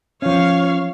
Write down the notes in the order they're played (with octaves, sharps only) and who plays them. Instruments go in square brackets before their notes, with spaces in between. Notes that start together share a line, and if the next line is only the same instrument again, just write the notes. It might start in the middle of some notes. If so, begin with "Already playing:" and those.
[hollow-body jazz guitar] F3 C#4 [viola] C#5 F5